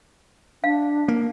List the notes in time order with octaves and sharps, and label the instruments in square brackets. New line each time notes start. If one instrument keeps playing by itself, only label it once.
[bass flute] D4 [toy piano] F5
[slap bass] A#3